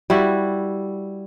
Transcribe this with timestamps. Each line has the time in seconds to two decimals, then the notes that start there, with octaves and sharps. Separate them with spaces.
0.10 G3 E4 F#4